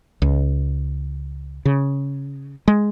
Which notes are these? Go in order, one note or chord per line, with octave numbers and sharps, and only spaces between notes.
C#2
C#3
G#3